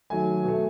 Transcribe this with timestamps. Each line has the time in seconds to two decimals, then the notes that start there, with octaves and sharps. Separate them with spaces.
0.10 D#3 F#3 A3 G#5
0.43 B2 A3